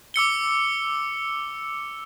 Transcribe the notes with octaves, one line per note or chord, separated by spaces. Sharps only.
D6 E6 C#7 G7